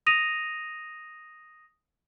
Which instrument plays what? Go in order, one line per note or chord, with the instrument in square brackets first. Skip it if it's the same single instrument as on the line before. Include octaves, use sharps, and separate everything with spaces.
[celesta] D#6 A#6 D#7 F7